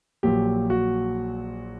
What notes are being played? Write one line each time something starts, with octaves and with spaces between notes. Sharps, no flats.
A#1 A#2 F#3 G4
F#4